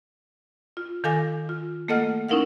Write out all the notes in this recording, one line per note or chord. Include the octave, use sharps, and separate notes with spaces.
F4
D#3 A4 F5 G#5 D6 A#6
F4
A3 A#3 A4 D#5 F#5 F6
C#4 D#4 E4 A#4 F5 F#5